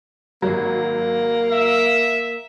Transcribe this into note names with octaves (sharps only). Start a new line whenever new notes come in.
G#1 F#3 A#3
E5